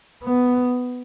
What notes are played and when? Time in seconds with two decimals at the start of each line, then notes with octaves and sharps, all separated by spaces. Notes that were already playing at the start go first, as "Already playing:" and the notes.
0.24 B3